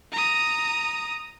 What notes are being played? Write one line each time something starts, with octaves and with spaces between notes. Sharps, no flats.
A#5 D#6